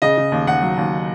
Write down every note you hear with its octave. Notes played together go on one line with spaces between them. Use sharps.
C#3 D#5
C#3
D#2
D#2 F#5
F#3
D#2